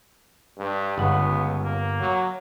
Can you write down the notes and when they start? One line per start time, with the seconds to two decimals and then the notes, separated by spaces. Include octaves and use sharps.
0.58 G2
0.98 G1 C#2 B3 F#5
1.64 A#3
2.00 F#3